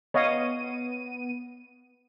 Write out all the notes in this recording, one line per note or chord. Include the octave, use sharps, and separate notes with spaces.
B3 C#5 D#5 F5 D#7